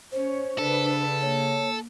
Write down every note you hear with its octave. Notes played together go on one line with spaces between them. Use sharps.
C#4 C5 C#5
C#3 D4 A4 B4
A#3 C#5